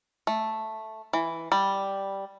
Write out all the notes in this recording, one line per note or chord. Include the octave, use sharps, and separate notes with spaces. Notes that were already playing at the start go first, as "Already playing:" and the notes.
A3
E3
G3